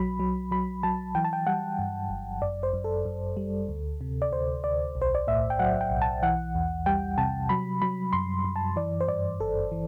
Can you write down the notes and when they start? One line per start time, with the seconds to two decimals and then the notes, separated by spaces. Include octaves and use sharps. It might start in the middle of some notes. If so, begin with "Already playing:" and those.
Already playing: B1 F#3 B5
0.20 F#3
0.51 F#3 B5
0.83 F#3 A5
1.15 E3 G5
1.25 A5
1.33 G5
1.47 G3 F#5
1.79 G2
2.10 G1
2.42 F#2 D5
2.63 C5
2.74 F#2
2.84 A4
3.05 F#2
3.37 G3
3.69 D2
4.01 C3
4.22 D5
4.32 D2 C5
4.64 D2 D5
4.95 B1
5.02 C5
5.15 D5
5.27 A2 E5
5.50 G5
5.59 F#3 F#5
5.81 G5
5.91 B1
6.02 A5
6.23 E3 F#5
6.55 E2
6.86 G3 G5
7.18 C3 A5
7.49 F#3 B5
7.82 F#3 B5
8.13 F#2 C6
8.44 F#2
8.56 A5
8.76 E3 D5
9.01 C5
9.08 G2 D5
9.40 G1 A4
9.72 E3